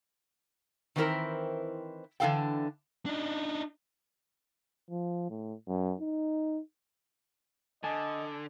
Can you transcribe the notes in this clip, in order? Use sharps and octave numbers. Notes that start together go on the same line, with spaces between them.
D#3 E3 C4 E4 A#4 C5
D3 E3 D4 A4 F5 G5
D4 D#4
F3
A2
F#2
D#4
D3 D#5 G#5 A5